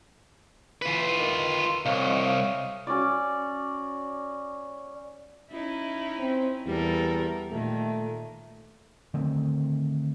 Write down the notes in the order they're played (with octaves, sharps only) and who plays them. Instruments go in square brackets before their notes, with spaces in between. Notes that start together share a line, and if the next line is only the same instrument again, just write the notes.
[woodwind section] E3 [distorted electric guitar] F4 B4
[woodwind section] D#3
[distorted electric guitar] C2 [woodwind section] C#5 D#5 F5
[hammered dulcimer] C#4 F#4 D5
[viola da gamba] C#4 D#4 E4
[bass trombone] C4
[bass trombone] E2 [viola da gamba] G3 A4 A#4
[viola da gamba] A#2 D#3 [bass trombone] A3
[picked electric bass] D3 D#3 A3 C4